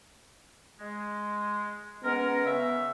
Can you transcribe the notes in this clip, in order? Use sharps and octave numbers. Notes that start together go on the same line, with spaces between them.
G#3
G#3 B3 C#4 A#4
C#3 E5